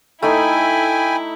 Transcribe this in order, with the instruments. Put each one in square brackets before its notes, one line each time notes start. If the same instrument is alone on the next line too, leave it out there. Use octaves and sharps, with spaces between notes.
[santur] A3 D#4 [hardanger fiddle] E4 [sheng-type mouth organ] G5 G#5 B5